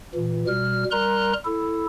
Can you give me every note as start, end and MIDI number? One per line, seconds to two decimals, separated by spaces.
0.15 0.44 46
0.15 0.44 52
0.47 0.84 47
0.47 0.84 55
0.47 0.84 89
0.91 1.33 55
0.91 1.33 70
0.91 1.33 82
0.91 1.33 84
0.91 1.33 90
1.45 1.86 64
1.45 1.86 69